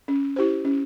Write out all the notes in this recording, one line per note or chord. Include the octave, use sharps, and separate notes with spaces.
C#4
E4 G4 C5
C#4